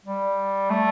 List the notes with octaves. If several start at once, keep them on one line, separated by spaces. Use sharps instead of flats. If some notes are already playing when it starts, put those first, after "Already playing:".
G3
A3